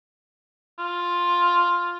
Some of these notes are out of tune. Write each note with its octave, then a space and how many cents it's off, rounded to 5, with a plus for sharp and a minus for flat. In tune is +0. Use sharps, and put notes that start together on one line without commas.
F4 +5